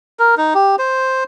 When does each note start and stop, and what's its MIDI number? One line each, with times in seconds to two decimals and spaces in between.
0.19 0.35 70
0.37 0.54 63
0.54 0.76 67
0.79 1.24 72